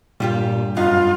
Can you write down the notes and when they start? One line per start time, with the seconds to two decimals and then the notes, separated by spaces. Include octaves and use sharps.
0.20 G2 A#2 G3 F4 G4
0.77 F#2 B3 D#4 F4 F5